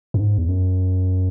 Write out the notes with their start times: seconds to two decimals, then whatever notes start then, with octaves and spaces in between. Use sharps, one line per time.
0.14 F#2
0.20 G#2
0.38 E2
0.48 F#2